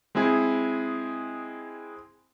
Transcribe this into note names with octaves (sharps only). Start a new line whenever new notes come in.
G#3 C4 E4 G#4